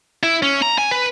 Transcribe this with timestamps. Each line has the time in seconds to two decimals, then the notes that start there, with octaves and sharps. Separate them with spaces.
0.23 E4
0.42 C#4
0.62 A#5
0.78 G#5
0.91 B4